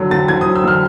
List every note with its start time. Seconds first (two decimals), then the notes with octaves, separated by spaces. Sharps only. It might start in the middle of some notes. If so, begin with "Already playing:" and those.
Already playing: D3 F#3
0.11 D3 A6
0.28 D3 G#6
0.41 D#6
0.46 F#3
0.55 E6
0.64 D3 F6